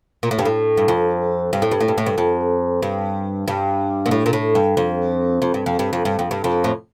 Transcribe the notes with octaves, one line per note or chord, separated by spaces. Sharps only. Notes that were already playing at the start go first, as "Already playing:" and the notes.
A#2
A2
G2
A2
G2
F2
G2
A2
G2
A2
G2
A2
G2
F2
G2
G2
A#2
A2
A#2
A2
G2
F2
F2
G2
F2
G2
F2
G2
F2
G2
F2
A2